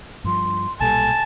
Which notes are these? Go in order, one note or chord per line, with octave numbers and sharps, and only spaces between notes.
G2 F3 C6
B1 A#2 G3 A4 G#5 A5